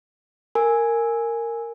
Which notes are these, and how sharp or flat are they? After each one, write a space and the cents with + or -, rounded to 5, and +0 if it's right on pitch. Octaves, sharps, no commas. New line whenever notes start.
A#4 -15 G#5 +0